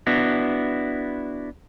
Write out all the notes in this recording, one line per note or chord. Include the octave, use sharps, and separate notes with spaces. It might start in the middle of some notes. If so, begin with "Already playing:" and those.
B3 D4 E4 F#4